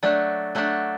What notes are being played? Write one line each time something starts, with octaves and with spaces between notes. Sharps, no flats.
F#3 A3 D4 D5
F#3 A3 D4